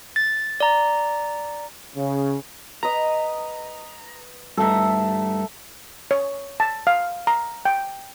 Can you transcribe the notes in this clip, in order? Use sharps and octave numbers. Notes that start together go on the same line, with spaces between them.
A6
D5 A#5
C#3
B4 D#5 A#5
G2 A3 A4 E5 A#5
C#5
A5
F5
A#5
G5